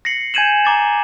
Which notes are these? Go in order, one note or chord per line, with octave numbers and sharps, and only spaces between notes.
A#6 C7 C#7 F#7
G#5 G6 G#6 D#7 E7 F#7
A#5 D6 A6